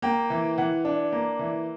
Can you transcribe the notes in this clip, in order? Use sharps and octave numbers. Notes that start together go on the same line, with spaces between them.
A#3 G5
E3
E3 F#5
D4
A#3
E3